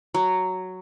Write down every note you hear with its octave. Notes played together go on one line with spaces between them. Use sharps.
F#3